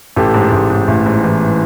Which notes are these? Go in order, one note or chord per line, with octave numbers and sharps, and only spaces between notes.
A1 G4 A4
G#2
A1
G#2
A1
G#2
E3